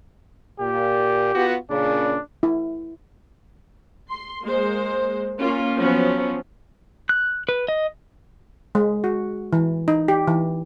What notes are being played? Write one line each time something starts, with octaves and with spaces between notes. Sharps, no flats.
A#2 G4
B3 F4 F#4
A#2 C#3 D4
E4
C6
G#3 A#3 C5
A#3 C#4 F4
F3 F#3 B3 C#4
F#6
B4
D#5
G#3
F#4
E3
D#4
G4
E3